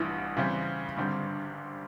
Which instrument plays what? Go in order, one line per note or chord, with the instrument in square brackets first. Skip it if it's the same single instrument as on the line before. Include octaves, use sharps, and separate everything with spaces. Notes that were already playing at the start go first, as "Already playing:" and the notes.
Already playing: [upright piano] A1 G2 E3 [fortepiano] E4
[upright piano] C#3 E3 G3 C4
G#1 G2 D3 G3 C4